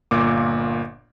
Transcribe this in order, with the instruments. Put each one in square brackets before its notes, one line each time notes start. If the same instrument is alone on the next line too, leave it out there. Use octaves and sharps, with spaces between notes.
[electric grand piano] G1 A#2 A#3 D6